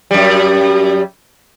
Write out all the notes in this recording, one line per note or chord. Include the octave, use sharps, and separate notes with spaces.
F#2 G3